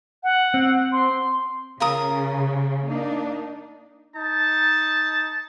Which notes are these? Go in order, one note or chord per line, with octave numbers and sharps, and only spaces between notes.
F#5
C4
C6
C#3 F4 A#4 D#6
A#3 D4 D#4
D#4 A5